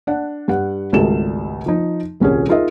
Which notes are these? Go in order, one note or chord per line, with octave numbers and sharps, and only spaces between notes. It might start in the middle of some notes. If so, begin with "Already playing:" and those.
D4 F#5
G2 F#5
G#1 C#2 G3 A3 A4 E7
F3 D#4
D#1 C2 C#4 F4 G#4
D#4 F4 G#4 A#4 D#5 E5